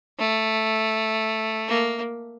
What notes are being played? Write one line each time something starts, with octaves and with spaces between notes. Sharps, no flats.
A3
A#3